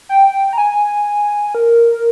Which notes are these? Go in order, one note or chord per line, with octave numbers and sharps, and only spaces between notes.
G5
A#5
G#5
A#4